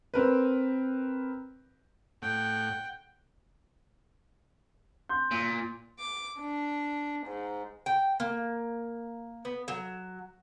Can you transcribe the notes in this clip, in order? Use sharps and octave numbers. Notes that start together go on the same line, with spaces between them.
C4 A#4 B4
A2 F#5 G5
C6 G6
A#2
D6
D4
G#2
G5
A#3
B3
F#3